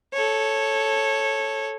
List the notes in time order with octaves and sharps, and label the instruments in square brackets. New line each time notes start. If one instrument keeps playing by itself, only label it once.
[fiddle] A4 C#5